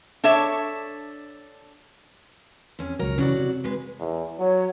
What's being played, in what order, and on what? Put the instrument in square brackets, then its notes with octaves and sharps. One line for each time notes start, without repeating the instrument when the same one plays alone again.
[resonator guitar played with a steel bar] D4 A4 C#5 E5
[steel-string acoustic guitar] F2 C#4
[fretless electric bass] C#2 F#3 [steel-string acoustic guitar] A#4 C#5
[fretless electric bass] C#3 E3 C#4 [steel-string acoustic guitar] F#3 F#4 D5
[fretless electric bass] C3
[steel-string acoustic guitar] G#3 B4
[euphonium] E2
[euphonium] F#3 [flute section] C#5